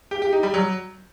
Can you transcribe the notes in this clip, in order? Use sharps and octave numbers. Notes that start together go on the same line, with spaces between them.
G4
G4
D#4
G3
F#3